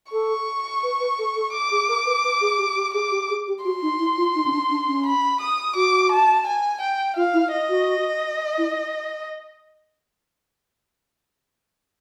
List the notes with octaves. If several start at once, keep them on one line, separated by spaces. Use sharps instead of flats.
A4 C#6
B4
B4
A4
A4
D6
G#4
A#4
B4
B4
G#4
G4
G4
G#4 D6
G4
G#4
G4
F#4 C6
D#4
E4
F4
D#4
C#4
D4
D4
C#4
B5
D#6
F#4 D6
A5
G#5
G5
F4 F5
E4
D#5
F#4
E4